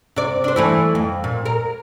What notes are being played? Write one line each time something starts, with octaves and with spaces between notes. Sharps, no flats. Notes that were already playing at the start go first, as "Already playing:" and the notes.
C3 D5
D4 C5
E3 A3 E4
F2
A#2
A#4